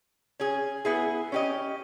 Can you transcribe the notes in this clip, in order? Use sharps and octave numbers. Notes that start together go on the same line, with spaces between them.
C#4 G#4
B3 E4 G#4
C#4 G4 D#5